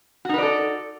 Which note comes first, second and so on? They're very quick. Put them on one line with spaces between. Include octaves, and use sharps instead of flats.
F#4 D#4 B4 D5 A4